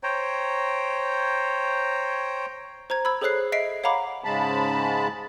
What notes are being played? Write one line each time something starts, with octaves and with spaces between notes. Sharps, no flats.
C5 C#5 G5 A#5
C5 A#5 G#6
B5 E6 G#6
G#4 A4 C5 C#5 F#6 C7
D#5 E5 B6 C7 D7
C#5 F5 F#5 A#5 B5 D6
G#2 C#3 G#3 A5 B5